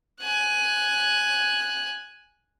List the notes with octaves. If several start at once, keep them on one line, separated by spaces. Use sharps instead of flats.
G#5 F#6